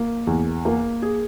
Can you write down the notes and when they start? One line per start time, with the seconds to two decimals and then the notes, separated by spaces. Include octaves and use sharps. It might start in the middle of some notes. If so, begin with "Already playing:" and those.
Already playing: A#3
0.27 E2
0.65 A#3
1.02 G#4